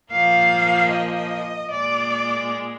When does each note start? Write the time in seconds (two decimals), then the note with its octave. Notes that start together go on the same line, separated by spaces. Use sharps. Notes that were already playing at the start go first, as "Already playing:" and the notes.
0.11 A#2 F3 A#3 F5
0.90 D#5
1.70 A#2 G#3 D5